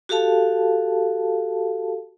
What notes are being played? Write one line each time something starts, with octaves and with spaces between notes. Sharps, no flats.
F#4 G4 A4 F5 A5